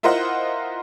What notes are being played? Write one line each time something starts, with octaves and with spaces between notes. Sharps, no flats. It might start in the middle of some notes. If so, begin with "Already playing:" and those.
E4 F4 A#4 C5 D#5 F#5